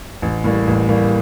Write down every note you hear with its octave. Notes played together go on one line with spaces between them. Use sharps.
A1
A2 G3 A#3
A1
A2 G3 A#3